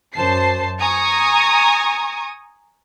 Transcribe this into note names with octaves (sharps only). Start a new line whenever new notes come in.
F#2 C5 A5 C7
G#5 A#5 C#6 D#6